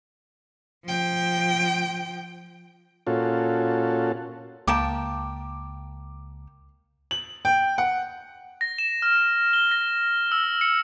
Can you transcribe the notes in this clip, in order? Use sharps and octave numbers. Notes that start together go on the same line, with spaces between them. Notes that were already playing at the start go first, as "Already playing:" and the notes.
F3 G5
A#2 C#4 F4 F#4 A4
C#2 A#3 G5 A5 D6
F#7
G5
F#5
A#6
E7
F6
G7
A#6
E6
C#7